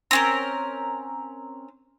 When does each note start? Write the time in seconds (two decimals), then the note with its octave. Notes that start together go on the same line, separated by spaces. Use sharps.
0.11 C4 C#4 A#4